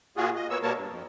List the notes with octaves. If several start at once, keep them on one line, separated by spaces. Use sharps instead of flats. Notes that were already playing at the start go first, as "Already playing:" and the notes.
A#2 F4 F#4 G#4
D#5
A#3 B3 C#5 E6
B2 G3 A#3 A#4 C#5 A5
G2
F2